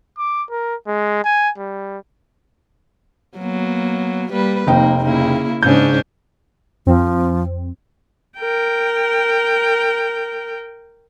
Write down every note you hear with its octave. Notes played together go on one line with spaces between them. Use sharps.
D6
A#4
G#3
G#5
G3
F#3 A#3 B3
G3 A#3 B4
F1 F2 A#3 D#4 G5
C#3 A#3 E4
G#2 C#3 C#4 D4 G6
F2 F3 C4
A#4 G5